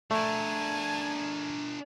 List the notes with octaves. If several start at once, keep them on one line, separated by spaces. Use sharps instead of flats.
A3 D4 A#4 G#5 A5